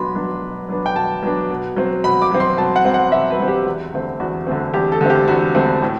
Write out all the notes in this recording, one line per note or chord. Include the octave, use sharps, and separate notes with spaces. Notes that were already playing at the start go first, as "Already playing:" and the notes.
Already playing: B2 F#3 B3 D4 B5 C6
F#3 B3 D4
B2
F#3 B3 D4
G5
B2 A5
F#3 B3 D4
B2
F#3 C4
B2 B5
D6
F#3 C4
C6
B2 A5
F#5
F#3 C4
F#5
B2 E5
B4
F#3 C4
G4
E2
D3 A3 C4
E2 F#4
D3 A3 C4
E2 G4
A4
D3 A3 C4
G4
E2 F#4
D3 A3 C4
A2